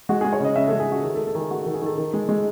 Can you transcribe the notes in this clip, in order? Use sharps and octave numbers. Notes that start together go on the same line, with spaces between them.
G#3 F#4
G#4
G#3
C#5
C#3 D#5
C#3 E5
A4
G#3
G#4
C#3 F#4
D#3 G#4
A4
A3
A4
D#3 G#4
A3 F#4
F#4
D#3
G#4
D#3 A4
D#3
G#3
G#3